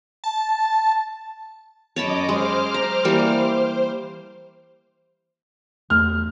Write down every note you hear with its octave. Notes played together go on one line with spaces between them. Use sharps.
A5
F#2 C#5 D#5 A5 B5 D6
G#3 C5 D6 F6
A#5
E3 G3 A#3
C5
E2 A3 F6